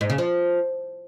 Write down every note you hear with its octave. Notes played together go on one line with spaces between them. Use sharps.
G#2
C#3
F3